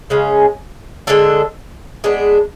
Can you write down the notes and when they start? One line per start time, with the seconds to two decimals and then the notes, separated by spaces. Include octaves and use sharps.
0.10 C#3 G#3 C#4
1.07 D3 G#3 D4 A4
2.04 G#3 B3 D4